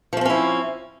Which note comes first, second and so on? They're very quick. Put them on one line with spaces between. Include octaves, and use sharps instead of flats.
F3 A3 C4 C#4 E4